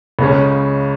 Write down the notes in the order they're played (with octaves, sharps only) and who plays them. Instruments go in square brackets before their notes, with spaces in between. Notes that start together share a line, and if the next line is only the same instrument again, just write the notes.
[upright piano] C#2 C#3 G#3 C#4